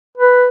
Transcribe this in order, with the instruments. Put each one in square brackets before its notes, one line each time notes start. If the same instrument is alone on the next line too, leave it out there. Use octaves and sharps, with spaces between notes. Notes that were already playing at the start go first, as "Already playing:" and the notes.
[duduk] B4